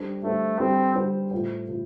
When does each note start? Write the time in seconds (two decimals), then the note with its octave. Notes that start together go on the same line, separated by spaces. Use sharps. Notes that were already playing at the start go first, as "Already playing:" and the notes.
Already playing: G3 D4 A4 C5
0.23 G3 A3 D4 A4 C5
0.59 G3 C4 D4 A4 C5
0.95 G3 D4 A4 C5
1.31 A2 A3 F4 C5
1.68 A2 A3 F4